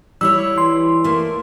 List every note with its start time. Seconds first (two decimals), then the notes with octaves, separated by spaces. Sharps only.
0.21 G3 E4 C#5 E6
0.58 E3 C6
1.04 A3 A#3